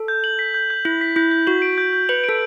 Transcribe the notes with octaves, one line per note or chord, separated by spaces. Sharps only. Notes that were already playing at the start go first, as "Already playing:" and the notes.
Already playing: A4
G6
F#7
B6
G6
G6
E4 F#7
B6
E4 G6
G6
F#4 F#7
D7
G6
G6
B4 F#7
A4 D7